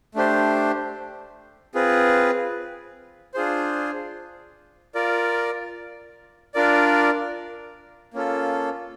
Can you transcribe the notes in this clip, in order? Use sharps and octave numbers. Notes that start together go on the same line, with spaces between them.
A3 D4 G4 C5
C4 F4 G#4 B4
D4 F4 G#4 C5
F4 A#4 D5
D4 F4 A#4 D5
A#3 C#4 F4 A4